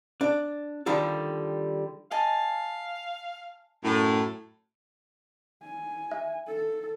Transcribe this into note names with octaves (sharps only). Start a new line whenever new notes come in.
D4
D3 D#3 F3 G3 A4
D#5 F5 G#5 A5
F#2 A2
G#5
E5
A4